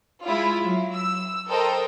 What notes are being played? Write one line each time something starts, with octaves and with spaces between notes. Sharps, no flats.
G#3 E4 F4
F#3
E6
A4 A#4 C5 D#5 G5